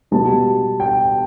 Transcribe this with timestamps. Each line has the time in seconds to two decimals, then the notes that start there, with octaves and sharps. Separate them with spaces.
0.11 B2 G3 B3 A5
0.80 G5